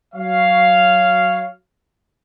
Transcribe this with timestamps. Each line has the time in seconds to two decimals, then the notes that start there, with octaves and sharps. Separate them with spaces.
0.14 F#3 C#5 F5